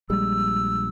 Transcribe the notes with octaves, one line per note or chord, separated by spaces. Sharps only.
A#1 G3 G#3 E6